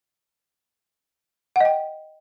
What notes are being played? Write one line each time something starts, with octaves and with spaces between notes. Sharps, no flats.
D#5 F#5 G5